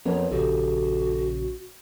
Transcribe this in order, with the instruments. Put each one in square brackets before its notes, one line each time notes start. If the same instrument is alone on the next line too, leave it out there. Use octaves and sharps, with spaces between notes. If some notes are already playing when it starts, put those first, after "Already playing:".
[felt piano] F2 B3 A#4 [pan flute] C#5
[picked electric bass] A#1 C#3 [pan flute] F#4 [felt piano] G4 [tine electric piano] A4